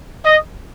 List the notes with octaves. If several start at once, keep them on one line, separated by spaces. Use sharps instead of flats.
D#5